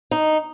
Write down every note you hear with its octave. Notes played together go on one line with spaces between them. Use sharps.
D#4